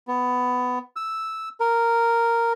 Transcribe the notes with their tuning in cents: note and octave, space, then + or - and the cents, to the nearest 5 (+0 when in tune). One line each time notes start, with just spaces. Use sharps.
B3 +15
E6 -5
A#4 -5